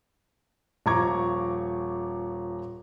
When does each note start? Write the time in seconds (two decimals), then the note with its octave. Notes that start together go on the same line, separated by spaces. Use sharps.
0.86 D#1 F3 A#5 C#6 D6 G#6